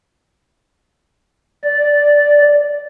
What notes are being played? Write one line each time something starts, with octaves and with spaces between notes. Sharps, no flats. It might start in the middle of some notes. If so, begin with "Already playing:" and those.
D5